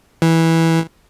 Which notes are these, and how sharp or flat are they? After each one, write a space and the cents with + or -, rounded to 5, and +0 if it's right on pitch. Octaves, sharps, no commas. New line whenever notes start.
E3 -10